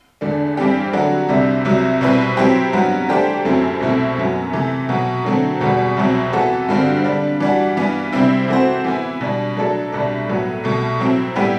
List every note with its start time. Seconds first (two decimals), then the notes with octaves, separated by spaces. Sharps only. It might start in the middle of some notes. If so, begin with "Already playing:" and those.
0.21 E2 D3 A3 D4
0.57 G2 E3 G3 C4 G4
0.93 D3 F#3 A3 D4 F#4
1.29 C2 C3 G3 D4
1.65 C2 C3 F#3
2.01 B2 G3 C4 E4 B4
2.37 F#3 C4 E4 G4 C5
2.73 G2 F#3 B3 F#4
3.09 E3 A3 D4 G4 C5
3.45 F#2 F#3 A3 C4 E4
3.81 C2 B2 A3 C4 E4
4.17 F#2 F#3 B3
4.53 C3 E3 A3
4.89 B2 F#3 B3 F#4
5.25 D3 F#3 A3 C4 F#4
5.61 E2 B2 G3 B3 F#4
5.97 C2 B2 F#3 C4
6.33 E3 B3 F#4 A4
6.69 G2 D3 G3 C4 F#4
7.04 D3 G3 D4
7.40 E3 G3 D4 F#4
7.77 G2 E3 B3
8.12 C3 G3 C4 E4
8.48 E3 A3 C4 F#4 C5
8.84 E3 B3 E4
9.21 B2 G3 D4
9.56 F#3 A3 D4 A4
9.92 C2 B2 G3 D4
10.28 A2 F#3 B3
10.64 C2 B2 A3
11.00 F#3 C4 E4
11.36 A2 G3 B3 E4 G4